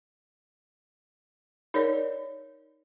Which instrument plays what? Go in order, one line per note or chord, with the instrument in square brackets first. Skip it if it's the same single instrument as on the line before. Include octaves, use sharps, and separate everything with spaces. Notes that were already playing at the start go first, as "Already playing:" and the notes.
[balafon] D#4 A#4 C#5 D5